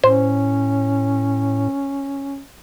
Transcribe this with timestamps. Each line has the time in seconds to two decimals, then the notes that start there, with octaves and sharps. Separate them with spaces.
0.04 A2 C#4 C5